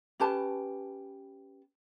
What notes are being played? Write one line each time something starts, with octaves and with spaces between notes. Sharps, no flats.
C#4 G4 B4 A5